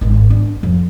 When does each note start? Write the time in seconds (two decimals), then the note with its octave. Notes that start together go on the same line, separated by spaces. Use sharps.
0.01 G#1 G#2
0.30 D4
0.63 F2